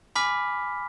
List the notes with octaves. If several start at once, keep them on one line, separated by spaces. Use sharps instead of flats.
G#5 B5 D6 F6 B6